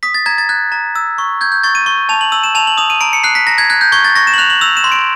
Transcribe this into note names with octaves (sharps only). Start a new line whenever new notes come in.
D#6 B6
A6
A#5 G#6
A6
F#6 G#6
A#5
E6
C#6
G6 G#6
G6
C#6 A6
D#7
C#6
A5 F7
F#7
E6 F#7
E7
A5 F7
F#7
D#6 F7
D#7
A#5 D7
C#7
F#6 C7
B6
A#5 A#6
G#6
F#6 G#6
G6
C#6 G#6
A6
C#6 A#6
E7
F#7
F#6 F7
F#7
E6 F7
E7
C6
D7